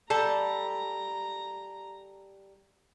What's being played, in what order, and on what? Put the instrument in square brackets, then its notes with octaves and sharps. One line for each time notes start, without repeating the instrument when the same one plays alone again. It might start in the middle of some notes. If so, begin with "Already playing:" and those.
[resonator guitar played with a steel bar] G3 A4 [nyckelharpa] A#5